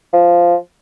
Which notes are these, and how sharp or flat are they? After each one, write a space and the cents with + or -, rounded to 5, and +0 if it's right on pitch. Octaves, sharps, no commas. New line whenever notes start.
F3 -5